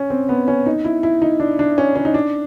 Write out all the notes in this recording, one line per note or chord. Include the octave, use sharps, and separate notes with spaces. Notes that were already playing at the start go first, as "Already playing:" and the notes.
Already playing: C#4
C4
B3
C#4
D#4
E4
E4
D#4
D4
D4
C#4
C#4
D#4
D4